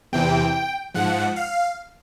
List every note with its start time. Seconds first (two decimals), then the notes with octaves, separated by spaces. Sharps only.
0.12 E2 C3 E3 G5
0.94 G#2 F3 F#5
1.36 F5